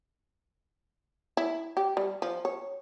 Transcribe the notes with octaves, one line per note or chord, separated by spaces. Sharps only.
E4
G4
G3
F3
C#5